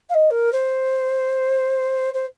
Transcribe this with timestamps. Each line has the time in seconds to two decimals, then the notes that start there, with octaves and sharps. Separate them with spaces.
0.09 F5
0.14 D#5
0.30 A#4
0.52 C5
2.14 C5